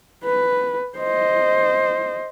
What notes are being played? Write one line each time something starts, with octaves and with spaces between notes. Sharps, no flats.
B4
C5 D#5